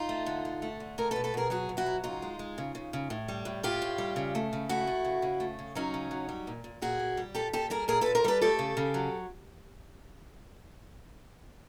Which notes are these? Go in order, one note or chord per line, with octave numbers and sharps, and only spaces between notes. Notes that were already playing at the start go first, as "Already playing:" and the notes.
Already playing: D#4 F4
A3
D3
D3
A3
D3
A3 G#4 A#4
A4 B4
B2
A4 B4
B2 G#4 A#4
F#3 F#4 G#4
B2
E4 F#4
F#3
C#3 D#4 F4
G#3
G#3
C#3
C#3
C#3
A2
G3
A2
A2 F4 G4
A2
G3
C#3
A3
C#3
A3 E4 F#4
A3
C#3
C#3
A3
C#3
F#3 C#4 D#4
C#3
F#3
G3
A#2
A#2
A#2 F#4 G#4
A#2
G3
A#2 G4 A4
A#2 G4 A4
G3 G#4 A#4
A#2 G#4 A#4
A#2 A4 B4
A#4 C5
G3 A4 B4
A3 G4 A4
C#3
C#3
F#3